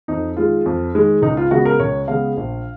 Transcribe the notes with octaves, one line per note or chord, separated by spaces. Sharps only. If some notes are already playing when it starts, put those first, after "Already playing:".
F2 D#4
D#3 G#3 F4
F2
D#3 G#3
C#2 D#4
F4
C#3 G#3 B3 F#4
A#4
C#2 C#5
C#3 G#3 B3 F5
A#1